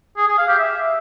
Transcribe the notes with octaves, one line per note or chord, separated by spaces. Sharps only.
G#4
G#4
F5
G4
E5